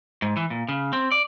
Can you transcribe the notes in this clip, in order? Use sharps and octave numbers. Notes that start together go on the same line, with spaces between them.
G#2
E3
A#2
C#3
C4
D5